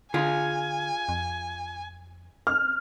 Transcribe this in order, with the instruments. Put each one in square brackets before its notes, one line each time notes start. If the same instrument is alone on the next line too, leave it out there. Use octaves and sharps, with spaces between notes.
[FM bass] D3 [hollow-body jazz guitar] F4 G#4 [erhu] G#5
[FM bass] F2
[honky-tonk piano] F6